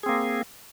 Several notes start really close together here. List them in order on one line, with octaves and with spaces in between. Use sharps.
G#4 C4 A#3